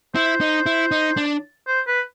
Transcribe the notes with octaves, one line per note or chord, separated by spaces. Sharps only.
E4 C5
D#4
E4
D#4
D4
C5
B4